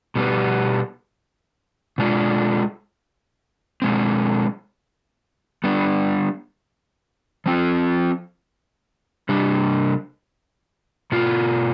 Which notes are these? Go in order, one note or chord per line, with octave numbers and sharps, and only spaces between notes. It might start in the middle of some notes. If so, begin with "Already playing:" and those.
B2 G3 B3
B2 G#3 D4 F4
B2 G#3 C4
G3 B3 D4
F3 C4 F4
C3 G3 D4
B2 B3 F4